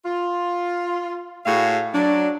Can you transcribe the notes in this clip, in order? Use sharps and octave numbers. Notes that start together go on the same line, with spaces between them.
F4
A2 F#4 G#4 F5
F#3 D4